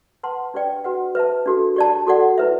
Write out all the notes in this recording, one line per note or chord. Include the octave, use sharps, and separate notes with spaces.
B4 F#5 A5 C6
D4 G4 B4 D5 G5
F#4 B4 F#5
B4 E5 A5
D4 F#4 A4
G4 D5 A5
F#4 A4 D5 F#5
E4 B4 E5